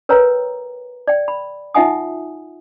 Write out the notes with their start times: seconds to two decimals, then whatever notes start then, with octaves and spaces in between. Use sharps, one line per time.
0.09 A#4 B4 C#5 G5 A#5
1.08 D5 G5
1.28 B5
1.75 D#4 F4 E5 F#5 G#5 D#6